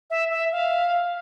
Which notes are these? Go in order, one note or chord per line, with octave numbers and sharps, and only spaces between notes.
E5
E5
F5